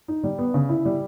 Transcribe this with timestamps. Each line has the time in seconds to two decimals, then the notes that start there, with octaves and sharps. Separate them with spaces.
0.08 D#4
0.23 G3
0.38 B3
0.54 C#3
0.69 E4
0.85 G3